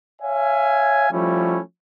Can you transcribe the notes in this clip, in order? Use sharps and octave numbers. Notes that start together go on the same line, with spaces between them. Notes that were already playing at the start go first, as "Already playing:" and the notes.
C#5 E5 F5 G#5
F3 G3 A3 C#4 E4